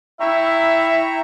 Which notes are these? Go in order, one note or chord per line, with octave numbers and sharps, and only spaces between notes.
E4 E5 G5 A#5 C#6